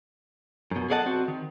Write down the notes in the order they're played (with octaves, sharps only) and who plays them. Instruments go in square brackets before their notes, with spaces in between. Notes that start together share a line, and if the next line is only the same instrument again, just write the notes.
[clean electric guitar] F#2 B2
G#4 A4 D5 D#5 F#5 A5
C4 F#4
D#3